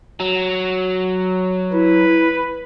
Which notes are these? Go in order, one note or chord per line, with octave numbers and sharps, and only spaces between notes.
F#3
E4 B4